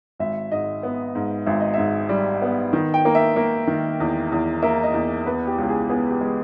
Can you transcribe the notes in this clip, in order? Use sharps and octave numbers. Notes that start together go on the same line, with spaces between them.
G#1 E5
G#2 D#5
B3
G#2
G#1 E5
D#5
G#2 E5
G3
B3
D#3
G5
A#3
E5
A#3
D#3
E2
E2
A#3 E5
D#5
E2
B3 B4
G4
C#2
G#4
B3 G#4
G4
G#3